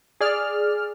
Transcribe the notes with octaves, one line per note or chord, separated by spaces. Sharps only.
G#4 D5 F6